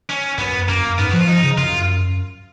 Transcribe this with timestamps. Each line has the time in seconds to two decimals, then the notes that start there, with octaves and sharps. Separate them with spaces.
0.10 C#4
0.38 F#2 B3
0.68 F#2 A#3
0.98 G#2 B3
1.11 F3 F#4
1.20 F4
1.28 F3 D#4
1.43 C#3
1.58 F#2 F4